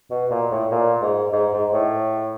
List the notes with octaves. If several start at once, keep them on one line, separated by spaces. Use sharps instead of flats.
B2
A#2
A2
A#2
G#2
G#2
G#2
A2